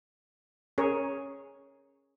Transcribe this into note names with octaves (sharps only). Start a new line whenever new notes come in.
C#4 G#4 A#4 C#5